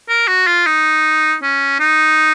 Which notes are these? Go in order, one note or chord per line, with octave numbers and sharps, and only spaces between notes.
A#4
F#4
F4
D#4
C#4
D#4